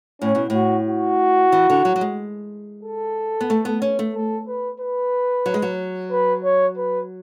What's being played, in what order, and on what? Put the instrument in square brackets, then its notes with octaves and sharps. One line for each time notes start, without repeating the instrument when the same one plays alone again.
[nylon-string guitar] A2 [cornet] C#4
[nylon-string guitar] B2
[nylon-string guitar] A2 [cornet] F#4
[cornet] F#4
[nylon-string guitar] E3
D3
F#3
F#3
G#3
[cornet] A4
[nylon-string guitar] B3
A3
B3
C#4
A3
[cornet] A4
B4
B4
[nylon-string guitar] F#3
G#3
F#3
[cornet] B4
C#5
B4